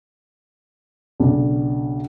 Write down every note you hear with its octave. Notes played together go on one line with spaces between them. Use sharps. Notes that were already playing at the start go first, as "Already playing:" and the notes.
B1 C#3 D4